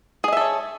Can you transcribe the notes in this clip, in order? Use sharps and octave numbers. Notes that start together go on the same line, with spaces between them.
G#4 A4 C#5 D#5 E5